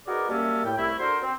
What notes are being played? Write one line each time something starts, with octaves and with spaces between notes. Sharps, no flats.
D#4 F#4 G#4 A#4 B4 D5
F#2 G3 A#3 C#4 E5 A5
A2 G5
C2 A3 E4
D4 F#4 A4 A#4 C5
C4